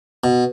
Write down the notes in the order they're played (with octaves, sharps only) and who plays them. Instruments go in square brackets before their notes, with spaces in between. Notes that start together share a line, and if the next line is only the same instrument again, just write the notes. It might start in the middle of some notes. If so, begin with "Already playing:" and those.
[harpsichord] B2